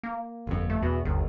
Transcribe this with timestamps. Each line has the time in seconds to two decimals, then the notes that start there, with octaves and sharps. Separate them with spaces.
0.03 A#3
0.47 G1 F2
0.70 A3
0.83 E2 B2
1.05 G1 D#2